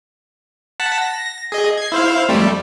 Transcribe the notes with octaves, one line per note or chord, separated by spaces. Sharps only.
F#5 A5 B6
A#6
G#4 D#5
G#6 C7
E4 C5 F5
F2 G3 A3